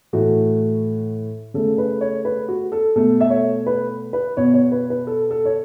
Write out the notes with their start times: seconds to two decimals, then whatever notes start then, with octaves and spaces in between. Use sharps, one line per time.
0.13 A2 E3 A3 F#4
1.54 C#3 A3 A4
1.78 B4
2.01 C#5
2.25 B4
2.48 F#4
2.72 A4
2.96 B2 A3 A4
3.20 E5
3.30 C#5
3.67 B4
4.13 B4
4.37 B2 B3 C#5
4.54 C#5
4.72 B4
4.90 B4
5.07 A4
5.31 A4
5.45 C#5